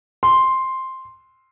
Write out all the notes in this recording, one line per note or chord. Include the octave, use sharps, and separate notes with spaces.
C6